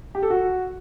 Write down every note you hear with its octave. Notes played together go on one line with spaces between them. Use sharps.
G4
A4
F#4